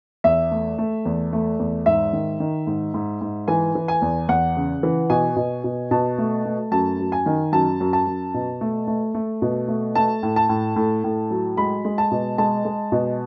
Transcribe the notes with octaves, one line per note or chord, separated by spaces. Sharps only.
E2 E5
A3
A3
E2
A3
E2
G#2 E5
D#3
D#3
G#2
G#2
G#2
E3 G#5
E3
G#5
E2
E2 F#5
C#3
E3
B2 G#5
B2
B2
B2 A5
A3
A3
F#2 A5
F#2
G#5
D#3
F#2 A5
F#2
A5
F#2
B2
A3
A3
A3
B2
A3
A3 A5
A2
A5
A2
A2
A2
F#3
G#3 B5
G#3
A5
B2
G#3 A5
G#3
B2